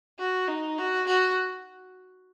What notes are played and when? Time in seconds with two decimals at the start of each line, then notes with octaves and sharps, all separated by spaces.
0.19 F#4
0.48 D#4
0.78 F#4
1.07 F#4